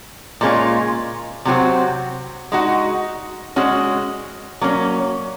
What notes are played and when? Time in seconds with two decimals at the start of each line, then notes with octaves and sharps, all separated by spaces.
0.41 A#2 G#3 C#4 F4
1.45 C3 F#3 C4 F#4
2.52 G#3 D#4 F#4
3.56 G#3 C#4 F#4
4.61 F#3 A#3 C#4